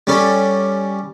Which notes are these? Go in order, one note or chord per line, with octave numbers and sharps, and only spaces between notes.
G3 C#4 A4